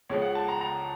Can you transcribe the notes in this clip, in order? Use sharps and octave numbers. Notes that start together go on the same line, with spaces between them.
C#2 C#3 F3 C#5
F#5
A5
A#5
A#5